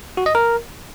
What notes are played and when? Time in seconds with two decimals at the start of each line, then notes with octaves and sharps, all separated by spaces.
0.17 F#4
0.26 D#5
0.35 A#4